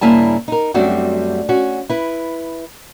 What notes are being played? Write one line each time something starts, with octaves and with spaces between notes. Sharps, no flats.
G2 C#3 A#3 E4 G#5 A5
D#4 A#4
F#2 G3 A3 C4 D4 F#4
C#4 F#4
E4 B4